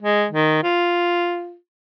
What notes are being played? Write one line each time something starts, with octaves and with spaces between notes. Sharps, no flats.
G#3
D#3
F4